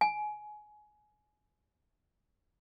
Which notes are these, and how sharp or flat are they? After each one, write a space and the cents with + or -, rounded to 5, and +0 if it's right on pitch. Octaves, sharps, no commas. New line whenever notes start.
G#5 +20